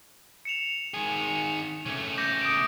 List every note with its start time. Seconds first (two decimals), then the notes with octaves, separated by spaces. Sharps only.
0.45 C#7 E7 F7
0.94 D#3 G#4
1.86 C#3 A3
2.18 D6 G6 A#6
2.42 D#6 D7